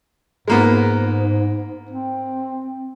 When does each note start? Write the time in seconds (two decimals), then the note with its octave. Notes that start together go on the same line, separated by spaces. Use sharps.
0.48 G#2 G#3 A#3 B3
1.91 C4